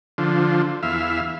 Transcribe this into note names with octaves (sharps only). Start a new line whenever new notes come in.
D3 F3
E2 E5 F5